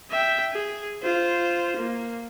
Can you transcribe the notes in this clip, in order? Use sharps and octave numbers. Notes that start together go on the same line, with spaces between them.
E5 G5
G#4
F4 C5
A#3